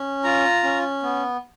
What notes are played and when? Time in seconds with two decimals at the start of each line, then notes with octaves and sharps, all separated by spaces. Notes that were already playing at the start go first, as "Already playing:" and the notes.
Already playing: C#4
0.24 F4 A#5
0.64 C#4
1.03 B3